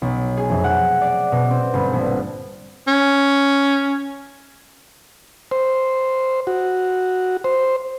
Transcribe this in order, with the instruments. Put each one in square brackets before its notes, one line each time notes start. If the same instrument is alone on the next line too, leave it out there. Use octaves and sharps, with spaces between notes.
[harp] B1
G#4
F1
F#5
D5
B2
C4
G1
A#1
[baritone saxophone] C#4
[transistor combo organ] C5
F#4
C5